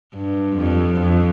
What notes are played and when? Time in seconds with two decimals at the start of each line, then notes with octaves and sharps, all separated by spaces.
0.14 G2
0.57 F2
1.01 F2